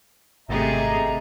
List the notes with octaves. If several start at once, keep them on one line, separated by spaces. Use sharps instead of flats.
G#1 C3 A3 G#4 D#5 E5 A#5